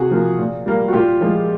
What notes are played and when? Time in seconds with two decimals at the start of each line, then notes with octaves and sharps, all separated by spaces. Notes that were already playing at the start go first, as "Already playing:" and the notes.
Already playing: C3 F#4 G#4
0.11 F3 A#3
0.39 A#2
0.66 G3 A#3
0.88 F#4
0.93 A#2 F4 G4
1.21 F3 G#3